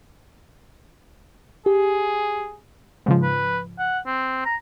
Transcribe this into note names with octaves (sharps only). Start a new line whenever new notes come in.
G4 G#4
G#2 C#3 F3
B4
F#5
C4
A#5